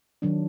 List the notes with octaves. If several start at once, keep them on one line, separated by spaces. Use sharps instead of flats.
D#3 F#3 D4